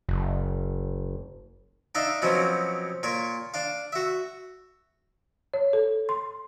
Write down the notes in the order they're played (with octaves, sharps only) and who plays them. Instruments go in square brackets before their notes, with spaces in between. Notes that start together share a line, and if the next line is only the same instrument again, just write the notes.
[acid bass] F#1
[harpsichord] D4 D#4 E5 F5
B2 F3 F#3 C4 C#4
A#2 C#5 C#6
D4 F5
F#4 E5
[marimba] C#5
A4
C6